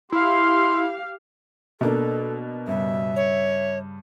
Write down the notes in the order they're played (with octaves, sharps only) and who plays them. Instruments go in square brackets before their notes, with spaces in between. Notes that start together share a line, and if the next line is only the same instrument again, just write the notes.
[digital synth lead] E4 [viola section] G4 F5 [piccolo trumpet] C6
[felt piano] B2 A#3 D4 [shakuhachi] A4
[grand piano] G2 C#3 [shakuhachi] E5
[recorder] C#5